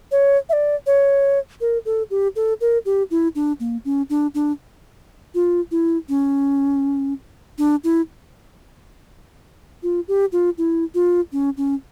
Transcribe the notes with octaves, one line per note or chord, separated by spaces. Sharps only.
C#5
E5
D5
C#5
A#4
A4
G4
A4
A#4
G4
E4
D4
A#3
C#4
D4
D4
F4
E4
C#4
D4
E4
F4
G4
F4
E4
F4
C#4
C#4